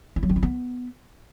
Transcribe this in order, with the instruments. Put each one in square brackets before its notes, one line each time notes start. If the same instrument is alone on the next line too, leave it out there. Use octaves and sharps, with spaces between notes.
[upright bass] E4
F#3
C4
E4
B3